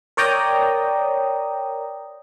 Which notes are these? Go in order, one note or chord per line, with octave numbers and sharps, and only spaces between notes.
A#4 C#5 D5 G5 A#5 D#6